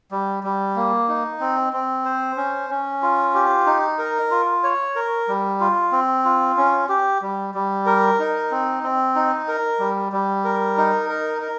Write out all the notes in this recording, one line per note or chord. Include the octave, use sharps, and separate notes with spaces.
G3
G3
A#3
D#4
C4
C4
C5
C#4
C#4
F4
G4
D#4
A#4
F4
C#5
A#4
G3
F4
C4
F4
C#4
G4
G3
G3
A#4
D#4
C4
C4
D#4
A#4
G3
G3
A#4
D#4
A#4
A#4